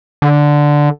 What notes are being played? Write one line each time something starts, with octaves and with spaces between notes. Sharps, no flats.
D3